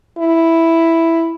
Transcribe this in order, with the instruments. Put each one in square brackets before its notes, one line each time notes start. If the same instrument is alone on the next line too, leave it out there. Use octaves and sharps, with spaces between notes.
[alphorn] E4